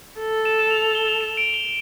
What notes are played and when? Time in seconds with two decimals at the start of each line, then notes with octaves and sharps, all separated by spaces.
0.20 A4
0.45 E7
0.59 E7
0.70 F7
0.82 F7
0.95 G7
1.08 F7
1.21 E7
1.37 D7
1.54 G7